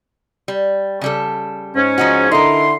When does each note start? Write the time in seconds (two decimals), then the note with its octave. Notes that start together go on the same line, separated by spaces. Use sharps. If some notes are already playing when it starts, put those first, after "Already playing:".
0.48 G3
1.01 C#3 G3 A4
1.75 G#2 C#4
1.98 F3 D#4 F#4
2.31 D3 D#4 E4 A#4 C6